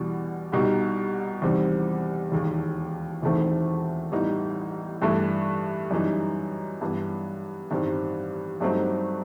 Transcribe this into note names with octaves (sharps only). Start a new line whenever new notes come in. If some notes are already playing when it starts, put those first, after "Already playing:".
Already playing: E2 B2 G3
C2 B2 G3 D#4 G4
E2 C3 D#3 G3 C4
E1 D#2 D#3
E1 E2 D#3 A3 C4
A1 A2 G3 B3 D#4
G2 E3 A3
F#2 E3 G3 D#4
G2 E3 B3
A1 G2 D#3 G3 C4
G2 F#3 A3 C4 D#4